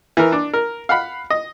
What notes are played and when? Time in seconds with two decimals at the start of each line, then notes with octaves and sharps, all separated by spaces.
0.17 E3 A#4
0.32 D4
0.53 A#4
0.89 F5 F#5 B5
1.30 D#5